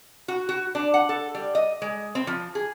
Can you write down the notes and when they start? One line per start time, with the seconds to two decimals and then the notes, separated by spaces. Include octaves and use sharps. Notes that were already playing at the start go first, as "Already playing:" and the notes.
0.28 F#4
0.49 F#4
0.75 D4
0.94 F#5
1.09 A4
1.35 G3
1.55 D#5
1.82 G#3
2.15 C4
2.27 F3
2.55 G#4